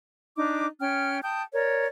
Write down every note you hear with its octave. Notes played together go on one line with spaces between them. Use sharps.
D4 D#4 D6
C#4 G5 F6
G5 A5 D#6 G6
A#4 C#5 D5